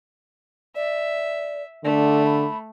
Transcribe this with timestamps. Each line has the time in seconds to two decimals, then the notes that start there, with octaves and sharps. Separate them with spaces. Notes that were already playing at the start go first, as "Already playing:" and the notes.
0.76 D5 E5
1.85 D3 A3 D5
2.26 B5